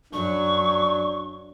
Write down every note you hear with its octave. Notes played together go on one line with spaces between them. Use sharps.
F#2 F#3 D4 C#6